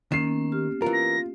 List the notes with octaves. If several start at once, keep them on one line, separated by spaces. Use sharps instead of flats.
D#3 A#3 C#4 C7 E7
B3 C#4
G4 F6
E3 F4 A#4
A#6